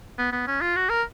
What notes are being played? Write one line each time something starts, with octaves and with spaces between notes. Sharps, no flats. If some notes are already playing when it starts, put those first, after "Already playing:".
B3
B3
C#4
F4
F#4
A#4